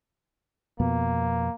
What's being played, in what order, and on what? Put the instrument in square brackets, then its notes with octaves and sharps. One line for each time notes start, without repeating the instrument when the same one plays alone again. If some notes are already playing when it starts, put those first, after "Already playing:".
[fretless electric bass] F2 B2 B3 [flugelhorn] A#3